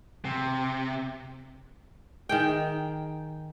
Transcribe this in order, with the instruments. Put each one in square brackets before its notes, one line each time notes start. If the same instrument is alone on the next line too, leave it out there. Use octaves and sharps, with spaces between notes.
[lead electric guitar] C3
[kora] D#3 G#4 G5